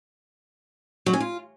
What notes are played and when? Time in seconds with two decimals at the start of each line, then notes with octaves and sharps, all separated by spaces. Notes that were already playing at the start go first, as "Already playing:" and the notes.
1.06 F#3
1.13 C#4
1.20 F4